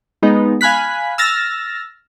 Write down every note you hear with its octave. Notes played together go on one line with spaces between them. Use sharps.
G#3 B3 D#4
F5 G#5 B5 F#6 B6
E6 F6 A6 A#6